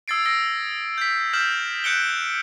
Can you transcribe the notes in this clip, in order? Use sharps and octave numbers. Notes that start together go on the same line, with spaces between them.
D#6 E6 G#6 A6 C7 D7
D#6 E6 A#6 C7 D7
G6 B6
D#6 F6 G6 B6 E7 F#7
F#6 G6 C#7 D7 G7